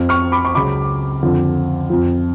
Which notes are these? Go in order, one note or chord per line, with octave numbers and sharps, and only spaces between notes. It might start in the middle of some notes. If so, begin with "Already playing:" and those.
Already playing: F2 F3
C#6 F6
B5 D6
C#6
C#2 C#3 F#3 B5 D6
F2 D3 F3
F2 F3